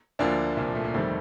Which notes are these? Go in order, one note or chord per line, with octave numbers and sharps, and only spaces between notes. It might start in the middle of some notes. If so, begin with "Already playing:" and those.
D2 D3 F3 A#3 D4
C2 A#2 F3
A3
A#3
F1 F2 D#3 G3 A3 C4